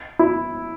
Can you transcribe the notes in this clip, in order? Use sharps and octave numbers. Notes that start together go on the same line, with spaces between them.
E4